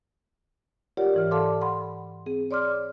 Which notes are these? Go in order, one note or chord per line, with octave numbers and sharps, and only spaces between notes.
F4 G4 A#4 C#5 D5 F#5
G#2 E3 F6
A4 D5 F5 A5 C6 D6
F#5 B5 C6
C4 G#4
C#5 D5 C6 D6 F6